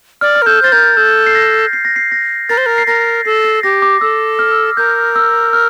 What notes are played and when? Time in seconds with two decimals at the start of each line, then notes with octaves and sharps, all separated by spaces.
0.21 D5 F6
0.35 F6
0.42 A#4
0.46 A4 G6
0.62 C5 A6
0.72 A#4 G6
0.97 A4 G6
1.26 C7
1.35 A#6
1.73 C7
1.85 A#6
1.96 C7
2.12 A#6
2.49 A#4 A6
2.58 C5
2.66 A#4
2.78 C7
2.87 A#4 A#6
3.25 A4 C7
3.44 C7
3.63 G4 A#6
3.82 D6
4.01 A4 E6
4.39 F6
4.77 A#4 G6
5.16 E6
5.53 F6